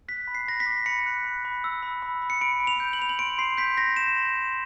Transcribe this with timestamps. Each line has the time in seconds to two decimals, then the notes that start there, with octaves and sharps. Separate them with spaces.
0.08 F#6 B6
0.28 B5
0.35 C7
0.48 B5 A#6
0.60 B6
0.66 D6
0.86 B5 C#7
1.06 F#6
1.25 B5
1.45 B5
1.64 E6
1.83 B5
2.02 B5
2.22 B5
2.30 C#7
2.41 B5 D7
2.60 B5
2.67 F7
2.80 G6
2.93 F#7
2.99 B5 F7
3.09 F#7
3.19 C6 D7
3.38 C6 C7
3.57 G6 B6
3.77 G6 A#6
3.96 G6 E7
4.16 C6
4.35 C6